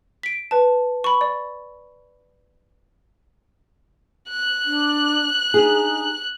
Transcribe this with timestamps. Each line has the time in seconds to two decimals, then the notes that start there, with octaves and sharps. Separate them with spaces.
0.23 B6 D7
0.51 B4 A5
1.04 B5 C#6
1.21 D5
4.29 F#6
4.65 D4
5.54 D4 D#4 G4 G#4